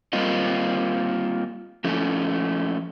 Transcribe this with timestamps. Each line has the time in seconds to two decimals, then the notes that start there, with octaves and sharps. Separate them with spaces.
0.13 G3 A#3 C4 F4 D#5
1.84 F3 A3 C#4